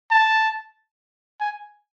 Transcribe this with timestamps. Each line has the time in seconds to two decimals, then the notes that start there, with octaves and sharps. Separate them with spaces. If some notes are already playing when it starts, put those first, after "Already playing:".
0.11 A5
1.40 G#5